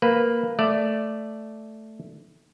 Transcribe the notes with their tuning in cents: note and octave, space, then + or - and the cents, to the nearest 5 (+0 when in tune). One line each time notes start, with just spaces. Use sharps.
A#3 +0 B4 +0
A3 +0 D5 +0